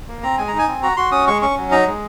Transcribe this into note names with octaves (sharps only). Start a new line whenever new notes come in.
A#3
C4 A#5
G#3 G#5
A#5
D#4
G#5
C4
F#4 A#5
F#4 C6
C#4 D#6
G#3 C#6
C#4 C#6
F#3
D#4 A#5
G#3